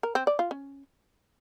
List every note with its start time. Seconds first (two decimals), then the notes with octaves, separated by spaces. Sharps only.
0.03 A#4
0.15 C4
0.27 D5
0.39 F4
0.51 C#4